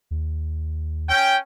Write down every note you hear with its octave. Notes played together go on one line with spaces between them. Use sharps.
D#2
C#4 G5